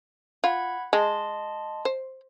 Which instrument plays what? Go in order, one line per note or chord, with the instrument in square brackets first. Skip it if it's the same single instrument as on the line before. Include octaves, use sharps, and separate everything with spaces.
[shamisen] F4 [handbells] F#5 B5 G#6
[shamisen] G#3 [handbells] D#5 A5 C6
[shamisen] C5